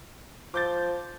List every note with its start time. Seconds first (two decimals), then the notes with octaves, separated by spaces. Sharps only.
0.54 F3 D6 G6 A6